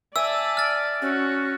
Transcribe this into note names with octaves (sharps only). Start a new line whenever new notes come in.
D5 E5 G#5 A5 E6
F6 A6
C#4 F#4